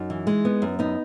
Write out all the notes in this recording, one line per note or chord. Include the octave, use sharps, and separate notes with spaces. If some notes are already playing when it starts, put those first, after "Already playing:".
Already playing: F#2 D#4
E3
G#3
B3
F#2
B3 D#4